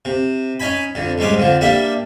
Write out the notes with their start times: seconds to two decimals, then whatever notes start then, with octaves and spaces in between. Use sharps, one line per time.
0.05 C3
0.60 C#4 D#4 G#5 B5
0.95 F2 D3
1.18 C2 G#2 G#3 C#4 D6
1.37 F2 D3 F3
1.61 G3 A#3 D4 E5